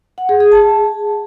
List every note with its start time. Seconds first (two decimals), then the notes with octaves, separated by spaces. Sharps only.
0.18 F#5
0.29 G#4
0.40 G#4
0.52 A5